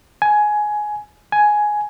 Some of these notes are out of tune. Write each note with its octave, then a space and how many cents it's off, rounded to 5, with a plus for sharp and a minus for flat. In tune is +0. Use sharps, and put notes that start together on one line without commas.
G#5 +15
G#5 +10